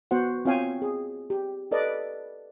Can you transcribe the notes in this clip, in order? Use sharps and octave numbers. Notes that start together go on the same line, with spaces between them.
B3 F#4 C5 F#5
C4 F4 C#5 F5 G5 G#5
G#4
G4
A4 B4 D5 D#5